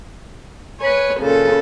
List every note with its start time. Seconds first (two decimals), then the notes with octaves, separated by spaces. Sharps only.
0.81 B4 C#5 G#5
1.20 A#2 C#3 A4